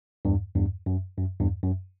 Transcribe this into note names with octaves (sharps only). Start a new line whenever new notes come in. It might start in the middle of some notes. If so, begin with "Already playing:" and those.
E2 G2
E2 G2
F#2
F#2
E2 G2
F#2